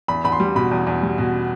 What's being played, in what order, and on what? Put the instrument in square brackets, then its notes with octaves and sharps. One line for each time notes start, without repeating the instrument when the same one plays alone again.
[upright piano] E2 B5
E2 B5
C6
G3
B2 B5
E2
E2
G3
B2